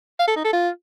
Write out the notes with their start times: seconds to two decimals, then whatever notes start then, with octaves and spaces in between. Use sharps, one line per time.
0.20 F5
0.28 A4
0.36 D#4
0.45 A4
0.53 F4